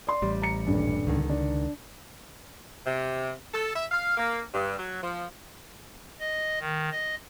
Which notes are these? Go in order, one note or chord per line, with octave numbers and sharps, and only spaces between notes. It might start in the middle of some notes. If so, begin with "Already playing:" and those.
D5 C6
A1 G3
A#5 C#7
D#1 G2
C#2 D3 D#3
D4
C3
A4
E5
F5
A#3
G2
F#3
F3
D#5
D#3
D#5